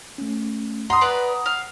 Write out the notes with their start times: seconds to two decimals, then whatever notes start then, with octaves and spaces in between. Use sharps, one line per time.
0.18 A3 C#4
0.90 F#5 A#5 C6 D#6
1.01 B3 B4 D5
1.46 F5